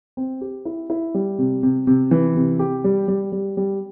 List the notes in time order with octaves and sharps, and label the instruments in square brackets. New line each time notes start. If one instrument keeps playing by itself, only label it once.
[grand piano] C4
G4
E4
E4
G3
C3
C3
C3
E3
C3
G4
G3
G3
G3
G3